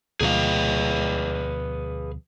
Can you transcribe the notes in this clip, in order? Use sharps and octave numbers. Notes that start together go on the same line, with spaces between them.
D2 B2 F3 G#4 B4 F5